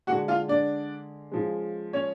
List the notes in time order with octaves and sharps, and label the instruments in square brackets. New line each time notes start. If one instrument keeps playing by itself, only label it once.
[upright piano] D3 G#3 F#4 F#5
F4 F5
D4 D5
C#3 F3 G#3
C#4 C#5